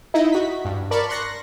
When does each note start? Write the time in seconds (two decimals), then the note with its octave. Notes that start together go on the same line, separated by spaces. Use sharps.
0.14 D#4 E4 D#5
0.32 F#4 B6
0.65 G2
0.91 A#4 D5 A5 B5 C#6
1.09 C6 C#6 F#6 A#6